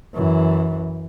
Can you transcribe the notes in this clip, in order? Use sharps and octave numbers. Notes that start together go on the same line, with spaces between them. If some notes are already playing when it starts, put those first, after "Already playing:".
F#2 E3